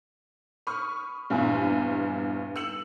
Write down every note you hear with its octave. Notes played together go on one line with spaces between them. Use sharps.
B5 C#6 D#6 F6
A#1 E2 G2 G3
E6 C#7 F#7